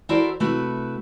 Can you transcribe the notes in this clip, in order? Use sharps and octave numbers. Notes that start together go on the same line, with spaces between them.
E4 F#4 A4 A#4 C5 D5
C3 A3 E4 F#4 B4